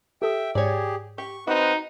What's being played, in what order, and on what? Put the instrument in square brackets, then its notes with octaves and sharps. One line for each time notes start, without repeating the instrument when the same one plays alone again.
[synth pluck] G4 A4 D#6 [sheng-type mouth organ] E5 G5
[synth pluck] G#2 [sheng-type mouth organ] G4 G#4 [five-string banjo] C#5 D5
[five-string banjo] G4 [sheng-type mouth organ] C#6
[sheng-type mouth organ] C4 B4 F#5 [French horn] D#4 [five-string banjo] F#4